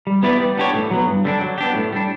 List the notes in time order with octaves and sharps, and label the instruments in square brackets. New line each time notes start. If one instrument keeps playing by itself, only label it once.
[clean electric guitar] G3
B3 E4 B4 D5
G3
B3 D4 G4 C#5
A2
F#3 B3
G2
D3 G3 B3 D4
F#3
B3 D4 G4
A2
G3 D4